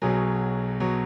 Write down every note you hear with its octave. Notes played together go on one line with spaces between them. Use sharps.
B1 B2 F#3 G#4
B2 F#3